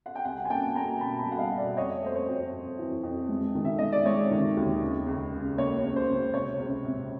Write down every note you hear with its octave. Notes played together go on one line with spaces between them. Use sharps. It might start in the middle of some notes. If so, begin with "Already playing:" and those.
F#5
G5
C2 F#5 G#5
G#5
A#3 G5 A5
A#3 G#5 A#5
B2 A5 B5
A5 B5
G3
F#5
D#5 F5
B2
D5 E5
F2 C#5 D#5
A3 C5
C#5
F2
F2
E3
F2
G#3
D#3
E5
G#3 D#5
D5
G#3 C#5
D#3
D#2
C#3
C#2
C#3
A#3 C#5
C#2
C5
C#2
C3 C#5
C#2
C3